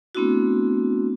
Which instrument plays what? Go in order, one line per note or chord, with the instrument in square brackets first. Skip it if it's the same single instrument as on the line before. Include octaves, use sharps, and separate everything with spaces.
[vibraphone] A3 B3 C4 D4 E4 F#4